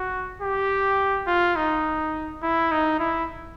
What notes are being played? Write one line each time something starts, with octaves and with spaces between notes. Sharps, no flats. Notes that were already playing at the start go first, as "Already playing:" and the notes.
Already playing: F#4
G4
F4
D#4
E4
D#4
E4